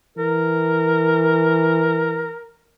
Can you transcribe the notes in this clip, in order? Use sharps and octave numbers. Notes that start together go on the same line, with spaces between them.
E3 A#4